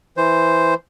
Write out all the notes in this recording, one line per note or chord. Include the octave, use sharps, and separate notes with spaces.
E3 C5